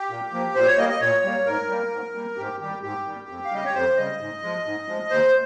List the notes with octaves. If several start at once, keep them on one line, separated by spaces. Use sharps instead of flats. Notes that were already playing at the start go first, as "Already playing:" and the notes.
Already playing: G4
A#2
F3 A#3
A#2 C5
C#5
G3 A#3 D#5
D#5
A#2 C#5
G3 A#3
G#2 A#4
G3 A#3
G#2
G3 A#3
G#2 G4
D#3 G3 G4
G#2 G4
D#3 G3
F2
F5
C#3 G3 D#5
C#5
F2 C5
C#3 G3 D#5
G#2
F3 G#3
G#2
F3 G#3
D#2 C5